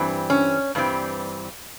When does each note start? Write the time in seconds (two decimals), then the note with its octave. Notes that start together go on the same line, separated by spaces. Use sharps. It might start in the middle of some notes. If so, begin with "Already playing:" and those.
Already playing: G2 E3 G3 C4
0.30 C#4
0.75 G2 E3 G3 C4